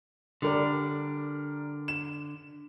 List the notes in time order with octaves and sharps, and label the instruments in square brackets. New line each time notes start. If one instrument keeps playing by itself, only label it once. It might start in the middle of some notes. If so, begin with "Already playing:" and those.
[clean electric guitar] D3 [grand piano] G3 A#4 D5
[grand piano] E7